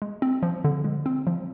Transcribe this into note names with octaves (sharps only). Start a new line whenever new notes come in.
G#3
C4
F3
D3
G#3
C4
F3